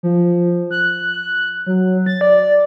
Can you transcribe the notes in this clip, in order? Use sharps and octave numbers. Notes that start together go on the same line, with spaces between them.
F3
F#6
F#3
A6
D5